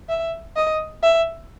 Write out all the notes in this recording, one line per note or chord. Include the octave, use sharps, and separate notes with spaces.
E5
D#5
E5